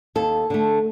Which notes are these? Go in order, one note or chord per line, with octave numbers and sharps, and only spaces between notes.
D#2 A4
D3 A3